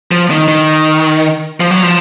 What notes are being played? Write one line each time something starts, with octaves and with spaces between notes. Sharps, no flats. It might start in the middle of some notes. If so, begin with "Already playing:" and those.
F3
D#3
D#3
F3
F#3
F3